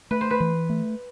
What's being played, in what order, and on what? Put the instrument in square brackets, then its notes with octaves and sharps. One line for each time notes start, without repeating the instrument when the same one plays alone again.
[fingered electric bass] A3 [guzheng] B4
[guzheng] C5
B4
[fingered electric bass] E3
A3